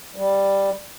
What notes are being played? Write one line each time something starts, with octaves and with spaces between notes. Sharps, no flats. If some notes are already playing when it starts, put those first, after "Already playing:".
G3